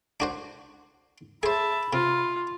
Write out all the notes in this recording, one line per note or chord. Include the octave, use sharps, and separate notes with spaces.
D4 F#4 C5
G#4 C5 E5 A5 B5
C3 F4